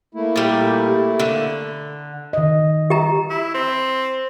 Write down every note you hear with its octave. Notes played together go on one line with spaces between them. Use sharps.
A3 A#3 E4
A#2 G3
D3
D#3 D#5
G4 A#5
E4
C4